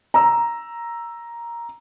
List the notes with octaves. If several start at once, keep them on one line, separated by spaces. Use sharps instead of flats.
A#5 E6